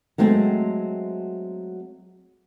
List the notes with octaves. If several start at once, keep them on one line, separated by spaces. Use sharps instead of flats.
F#3 G#3 A3 C4